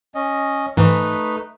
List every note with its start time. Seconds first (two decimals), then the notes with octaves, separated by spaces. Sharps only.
0.15 C#4 D#5
0.77 G#2 E3 A3 D#4 B4